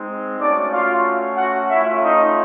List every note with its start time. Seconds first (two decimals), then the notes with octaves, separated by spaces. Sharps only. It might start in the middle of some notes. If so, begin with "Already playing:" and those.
Already playing: G#3 C4 D#4
0.40 A3 C#4 D4 F#4 D5
0.72 F4 F5
1.37 F#4 F#5
1.69 A3 C#4 E4 F4 E5
2.02 D#4 D#5